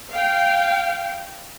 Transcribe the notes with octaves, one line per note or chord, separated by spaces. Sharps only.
F5 G5